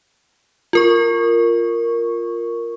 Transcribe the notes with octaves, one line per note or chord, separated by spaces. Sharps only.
F4 A#4 C#6